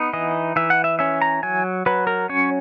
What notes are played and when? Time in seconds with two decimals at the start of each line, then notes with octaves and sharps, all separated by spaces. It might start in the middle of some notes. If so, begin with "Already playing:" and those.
Already playing: B3 D#4
0.13 E3 D#5
0.56 E3 E5
0.70 F#5
0.84 E5
0.99 C#4 E5
1.22 A#5
1.43 F#3 G#5
1.86 F#3 B4
2.07 A#4
2.29 C#4 C#5